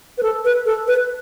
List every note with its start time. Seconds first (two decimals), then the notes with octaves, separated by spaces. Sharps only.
0.18 B4
0.23 A4
0.45 B4
0.66 A4
0.87 B4